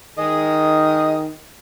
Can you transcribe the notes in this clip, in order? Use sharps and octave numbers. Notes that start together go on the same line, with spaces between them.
D#3 G#4 D#5